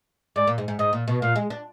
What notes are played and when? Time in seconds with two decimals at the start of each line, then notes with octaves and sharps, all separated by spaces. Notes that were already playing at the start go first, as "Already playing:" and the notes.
0.36 G#2 D5
0.47 A#2
0.58 G#2
0.68 G#2
0.79 G#2 D#5
0.93 A#2
1.08 B2
1.22 A#2 F5
1.36 G#3
1.50 D4